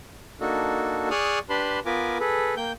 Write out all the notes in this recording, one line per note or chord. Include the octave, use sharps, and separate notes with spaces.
A#3 D4 D#4 F#4 A4
G#4 D5 C#6 D#6 F6 F#6
D4 G4 B4 A5 B5 C6
B3 F4 A#4 B4 G#5 D6
G#4 A4 B4
A#3 G5 G6